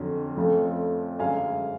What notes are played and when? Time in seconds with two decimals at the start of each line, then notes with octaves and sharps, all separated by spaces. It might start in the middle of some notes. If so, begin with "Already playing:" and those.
Already playing: F2 D3 F#3 C#4
0.37 F2 F3 A3 C#4
1.19 F#2 D3 G#3 D4 F5 G#5